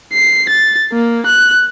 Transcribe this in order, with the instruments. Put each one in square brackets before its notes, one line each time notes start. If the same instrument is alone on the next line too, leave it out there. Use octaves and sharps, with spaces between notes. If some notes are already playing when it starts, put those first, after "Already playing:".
[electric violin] C7
A6
A#3
F#6